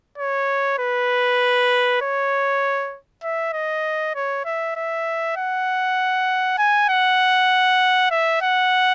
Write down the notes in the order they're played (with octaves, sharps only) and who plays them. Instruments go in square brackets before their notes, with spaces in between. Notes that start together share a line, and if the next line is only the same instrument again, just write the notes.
[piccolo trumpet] C#5
B4
C#5
E5
D#5
C#5
E5
E5
F#5
G#5
F#5
E5
F#5